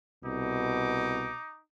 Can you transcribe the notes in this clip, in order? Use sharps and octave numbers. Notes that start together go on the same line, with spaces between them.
C2 B2 D#4 D6